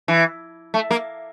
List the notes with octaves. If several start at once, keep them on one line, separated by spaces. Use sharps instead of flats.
E3
A3
A#3